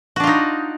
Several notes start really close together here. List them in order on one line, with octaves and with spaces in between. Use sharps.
F#4 D4 F4 D#4